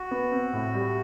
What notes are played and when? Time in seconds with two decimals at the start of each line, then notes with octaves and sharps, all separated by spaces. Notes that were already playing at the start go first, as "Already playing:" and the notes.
Already playing: F#4
0.11 B3
0.32 C4
0.53 A2
0.74 G3